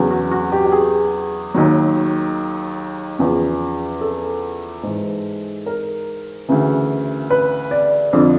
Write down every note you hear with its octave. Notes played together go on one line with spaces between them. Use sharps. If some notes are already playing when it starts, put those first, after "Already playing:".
Already playing: E2 C#3 F#3
F#4
F#4
G4
G4
G#4
D#2 D#3 F#3
E2 C#3 F3
A4
G#2 E3
A#4
D2 C#3 E3
B4
D5
F2 D3 F3